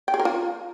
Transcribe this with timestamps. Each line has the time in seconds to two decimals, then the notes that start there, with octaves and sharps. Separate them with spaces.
0.08 G5
0.14 G#4
0.19 A#4
0.25 F4